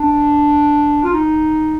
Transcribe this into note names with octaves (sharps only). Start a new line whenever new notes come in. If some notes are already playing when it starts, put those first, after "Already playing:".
Already playing: D4
F4
D#4